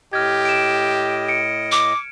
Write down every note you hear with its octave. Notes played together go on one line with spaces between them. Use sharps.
A2 G4 D#5 F6 G#6
D7 E7
C#7 D7
D6